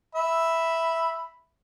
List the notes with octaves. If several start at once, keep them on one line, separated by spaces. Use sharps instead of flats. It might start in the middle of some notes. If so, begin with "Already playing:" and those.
E5 B5